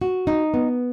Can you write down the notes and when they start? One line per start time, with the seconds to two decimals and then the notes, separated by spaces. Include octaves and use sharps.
0.01 F#4
0.27 D#4
0.54 B3